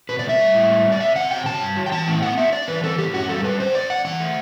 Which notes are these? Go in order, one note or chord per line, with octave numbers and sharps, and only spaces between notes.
B2 B4
D5
A3
E5
G3
A2
G3
G3
D5
C3 E5
C3 F#5
F#3 G5
F#3 A5
G2
F#3
G5
E3 A5
A2 G5
B3 F#5
D4 E5
D4 D5
E3 B4
C4 A4
A2 G4
F#2 F#4
G3 A4
D4 B4
D3 C5
F#2 D5
F#2 F#5
E3 F#5
A3